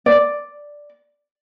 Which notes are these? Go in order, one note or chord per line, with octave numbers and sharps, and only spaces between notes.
D5